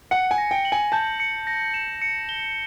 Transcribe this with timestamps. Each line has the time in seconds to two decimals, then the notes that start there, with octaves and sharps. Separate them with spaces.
0.11 F#5 C#7
0.31 G#5
0.38 A#6
0.51 G5
0.65 F#7
0.72 G#5
0.92 A5 G6
1.20 C#7
1.47 A#6
1.74 E7
2.02 C#7
2.29 G7